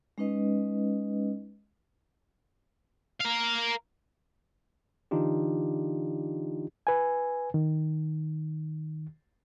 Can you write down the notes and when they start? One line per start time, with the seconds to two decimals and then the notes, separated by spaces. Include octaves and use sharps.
0.18 G#3 C#4 D#4 B4 D#5
3.21 A#4 F5
5.11 D3 E3 D4 D#4 F4 G4
6.87 B4 G#5
7.54 D#3